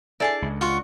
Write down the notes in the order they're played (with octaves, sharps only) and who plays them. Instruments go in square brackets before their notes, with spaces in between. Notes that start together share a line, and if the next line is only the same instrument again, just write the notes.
[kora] D4 A4 D5 [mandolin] E4 G#4 A5
[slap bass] C#2
[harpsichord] F4 [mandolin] F#4 F#5 C#6